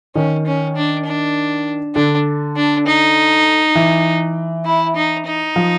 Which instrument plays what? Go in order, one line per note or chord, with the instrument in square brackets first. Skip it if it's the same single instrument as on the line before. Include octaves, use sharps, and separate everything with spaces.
[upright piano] D#3 [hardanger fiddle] C#4
[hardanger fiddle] C#4
D4
D4
[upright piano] D3 [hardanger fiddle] D4
[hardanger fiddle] D4
D#4
[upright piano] E3
[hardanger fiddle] E4
D#4
D#4
[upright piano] F3